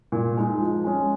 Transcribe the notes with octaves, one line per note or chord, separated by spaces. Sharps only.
A#2
G#3 D#4
F3
G#3 C#4